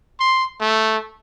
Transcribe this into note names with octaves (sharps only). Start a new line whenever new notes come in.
C6
A3